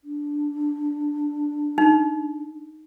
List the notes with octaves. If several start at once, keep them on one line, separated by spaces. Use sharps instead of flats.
D4
D#4